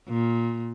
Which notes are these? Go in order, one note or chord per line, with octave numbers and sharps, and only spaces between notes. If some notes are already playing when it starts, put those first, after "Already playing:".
A#2